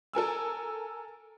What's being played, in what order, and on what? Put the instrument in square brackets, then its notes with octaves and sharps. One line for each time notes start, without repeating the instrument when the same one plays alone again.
[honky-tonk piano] A4 A#4 G#5 E6